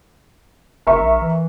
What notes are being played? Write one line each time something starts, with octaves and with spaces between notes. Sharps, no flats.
F#1 A#4 E5 C#6
A#1
E3